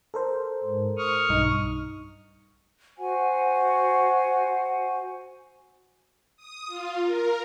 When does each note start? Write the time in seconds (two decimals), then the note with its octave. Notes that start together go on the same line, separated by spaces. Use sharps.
0.14 A4 A#4 C5
0.63 G#2
0.97 C#6 D#6 F6
1.29 B1 G2 D#4
2.98 F#4 C5 F#5 G#5
6.37 D#6
6.67 F4
7.02 A#4